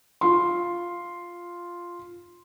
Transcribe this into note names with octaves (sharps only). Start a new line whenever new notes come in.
F4 C6